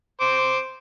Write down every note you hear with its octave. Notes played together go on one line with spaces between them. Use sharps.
C5 D6